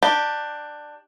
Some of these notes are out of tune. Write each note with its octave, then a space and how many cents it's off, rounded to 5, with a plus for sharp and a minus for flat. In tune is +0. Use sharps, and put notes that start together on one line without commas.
D4 +15 G4 +0